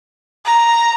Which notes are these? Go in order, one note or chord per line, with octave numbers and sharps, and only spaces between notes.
A#5